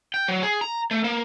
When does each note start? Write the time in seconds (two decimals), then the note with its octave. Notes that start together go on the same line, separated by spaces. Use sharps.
0.14 G5
0.28 F#3
0.43 G#4
0.61 A#5
0.91 A3
1.04 A#3